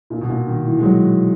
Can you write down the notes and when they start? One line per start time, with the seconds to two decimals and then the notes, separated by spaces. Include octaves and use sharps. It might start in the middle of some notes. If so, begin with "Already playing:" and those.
0.10 A#2
0.21 B2
0.29 A#2
0.47 D#3
0.65 E3
0.79 G#3
0.83 F#3